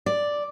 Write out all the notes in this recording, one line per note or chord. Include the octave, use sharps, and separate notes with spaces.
D5